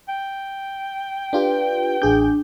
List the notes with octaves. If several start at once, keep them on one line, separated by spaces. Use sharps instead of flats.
G5
D4 F4 G4 B4
A1 D4 G#4 G6